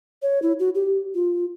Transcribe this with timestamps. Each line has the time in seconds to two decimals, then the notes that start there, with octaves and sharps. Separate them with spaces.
0.22 C#5
0.42 E4
0.59 F#4
0.75 G4
1.15 F4